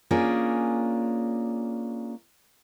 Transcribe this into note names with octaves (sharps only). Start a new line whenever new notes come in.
A#3 C#4 D4 F4 G#4